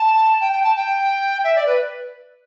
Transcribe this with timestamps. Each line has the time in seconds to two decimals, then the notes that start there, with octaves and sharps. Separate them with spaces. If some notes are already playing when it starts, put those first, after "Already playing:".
Already playing: A5
0.41 G5
0.52 G5
0.64 A5
0.76 G5
1.44 E5
1.56 D5
1.66 B4